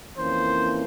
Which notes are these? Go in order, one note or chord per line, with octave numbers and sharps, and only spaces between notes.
F2 E3 A#3 C#4 C5